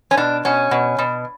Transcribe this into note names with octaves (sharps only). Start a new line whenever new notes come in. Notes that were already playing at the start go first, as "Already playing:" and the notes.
C#4
B2 D4
B2 C#4
B2
B2